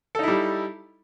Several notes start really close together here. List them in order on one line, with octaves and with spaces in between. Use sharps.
A4 D#4 E4 G3